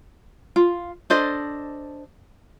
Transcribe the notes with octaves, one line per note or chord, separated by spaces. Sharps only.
F4
D4 A4 C5 D#5